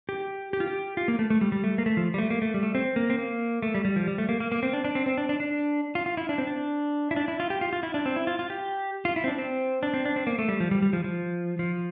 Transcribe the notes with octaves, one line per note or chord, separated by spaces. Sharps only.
G4
G4
F4
G4
F4
A#3
A3
A3
G3
G3
A3
A#3
A3
F3
G3
A3
A#3
A3
G3
A3
C4
A#3
C4
A#3
A3
G3
G3
F3
G3
A3
A#3
A#3
A#3
C4
D4
D4
C4
C4
D4
D4
D4
F4
F4
E4
D4
C4
D4
E4
D4
E4
F4
G4
F4
F4
E4
D4
C4
E4
F4
F4
G4
F4
E4
C4
D4
C4
D4
C4
D4
C4
A#3
A3
G3
F3
G3
G3
F3
F3
F3